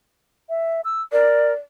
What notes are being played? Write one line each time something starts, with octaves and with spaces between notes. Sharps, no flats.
E5
E6
A#4 D5